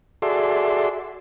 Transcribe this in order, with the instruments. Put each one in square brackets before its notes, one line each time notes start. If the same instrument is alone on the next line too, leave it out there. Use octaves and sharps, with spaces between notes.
[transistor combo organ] F#4 G#4 A4 D5 E5 C6